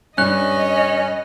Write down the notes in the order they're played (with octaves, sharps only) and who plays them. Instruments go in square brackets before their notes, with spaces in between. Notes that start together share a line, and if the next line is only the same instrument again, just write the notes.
[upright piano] G2 D4 [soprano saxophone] C#4 [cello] D#5 [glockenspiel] F#6